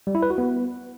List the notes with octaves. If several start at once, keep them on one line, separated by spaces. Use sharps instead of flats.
G3
E4
B4
F#4
B3